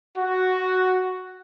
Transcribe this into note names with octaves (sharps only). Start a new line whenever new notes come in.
F#4